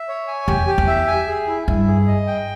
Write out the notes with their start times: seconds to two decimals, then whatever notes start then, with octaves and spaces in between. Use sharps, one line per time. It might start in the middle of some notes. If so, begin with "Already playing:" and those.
Already playing: E5
0.08 C#5
0.28 G#5
0.48 E2 G4
0.67 G4
0.78 E2
0.87 E5
1.08 G#5
1.27 G#4
1.47 E4
1.68 G2 E4
1.88 G#4
2.07 D#5
2.27 G5